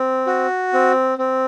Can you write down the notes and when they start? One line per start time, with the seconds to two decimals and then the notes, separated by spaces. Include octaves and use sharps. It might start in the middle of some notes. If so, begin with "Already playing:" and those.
Already playing: C4
0.27 F#4
0.73 C4
1.18 C4